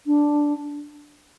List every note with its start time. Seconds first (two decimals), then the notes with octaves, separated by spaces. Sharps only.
0.06 D4